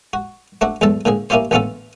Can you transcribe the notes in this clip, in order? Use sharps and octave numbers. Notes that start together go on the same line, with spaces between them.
F#4
A3 C4 D4 F#4
B1 E2 A2 A4 A5
A#2 D3 C4 G#4
A#3 C#4 E4 F4 G4 C5
A1 D3 B3 C#4 F4 A4